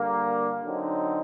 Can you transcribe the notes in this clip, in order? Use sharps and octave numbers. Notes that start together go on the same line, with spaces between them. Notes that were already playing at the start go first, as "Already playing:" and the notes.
Already playing: D3 G3 A#3
D3 F#3 C4 D#4